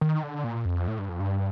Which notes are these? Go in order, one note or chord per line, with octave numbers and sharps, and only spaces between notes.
D#3
D3
A#2
F2
A2
G2
F2
G2